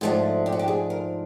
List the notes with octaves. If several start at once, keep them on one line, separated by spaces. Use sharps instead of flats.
G#2 F3 A3 D4 F4
G4
F#4
G4
G#4
A#4